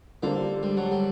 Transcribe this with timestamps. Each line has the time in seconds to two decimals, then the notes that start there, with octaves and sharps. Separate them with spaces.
0.23 D3 G3 A#3 D4 A4 C5
0.63 G3
0.77 F#3
0.92 G3